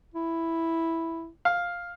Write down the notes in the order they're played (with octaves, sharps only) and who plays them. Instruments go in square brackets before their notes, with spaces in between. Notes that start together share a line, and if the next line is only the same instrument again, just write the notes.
[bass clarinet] E4
[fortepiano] F5